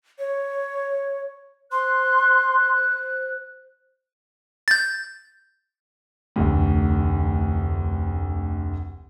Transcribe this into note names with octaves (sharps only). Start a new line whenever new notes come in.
C#5
C5 C6 F#6
G6 A6
F1 D2